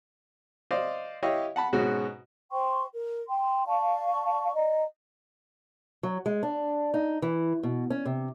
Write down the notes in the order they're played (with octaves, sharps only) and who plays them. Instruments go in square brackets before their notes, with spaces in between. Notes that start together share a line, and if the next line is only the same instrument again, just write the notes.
[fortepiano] C5 D5 D#5 F5
E4 G4 C#5 D#5 F5
F#5 A5 B5
G#2 B2 G#3 C#4 F#4
[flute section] C5 G5 C6 C#6
A#4
G5 C6
D5 F5 A5 C#6
D5 D#5 A#5
[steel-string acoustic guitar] F#3
G#3
D4
D#4
E3
B2
C#4
C3